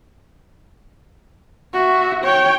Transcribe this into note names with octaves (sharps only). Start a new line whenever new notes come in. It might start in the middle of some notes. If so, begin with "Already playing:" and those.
F#4 E5
C#5 G5